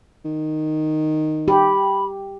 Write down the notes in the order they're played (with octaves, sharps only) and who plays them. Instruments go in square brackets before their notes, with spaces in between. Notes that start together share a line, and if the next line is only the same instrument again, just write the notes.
[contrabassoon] D#3
[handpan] G4 [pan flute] B5